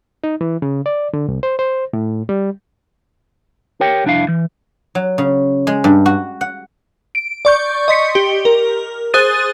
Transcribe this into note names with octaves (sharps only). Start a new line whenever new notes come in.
D#4
E3
C#3
D5
D3
C2
C5
C5
A2
G3
G4 A#4 C#5 G5
C2 F2 D4 E4 F5
E3
F#3
C#3
G#3
G2
F#4
F#5
D7
D5 C#6 G6
D#5 C6 B6 C#7
G4
A#4
G#4 C5 D#6 F#6 A6 D#7